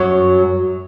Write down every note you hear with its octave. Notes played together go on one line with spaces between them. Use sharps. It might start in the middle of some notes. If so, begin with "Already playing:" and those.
Already playing: F#2 F#3